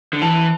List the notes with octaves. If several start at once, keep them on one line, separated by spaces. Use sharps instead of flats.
D3
E3 A5